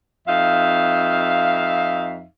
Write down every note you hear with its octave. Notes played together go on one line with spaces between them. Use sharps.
F2 D#4 E5 F5